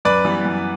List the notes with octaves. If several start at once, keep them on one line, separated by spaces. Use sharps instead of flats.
F#2 B4 D5
E3 G3 B3
F#2